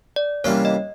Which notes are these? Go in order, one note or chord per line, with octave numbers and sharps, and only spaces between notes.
D5
C3 E3 G3 A#3 C#4 C#5
D#5